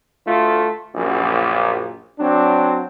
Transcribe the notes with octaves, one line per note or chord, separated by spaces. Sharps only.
D2 A3 F4
A#1 F#2
F#3 C4 D4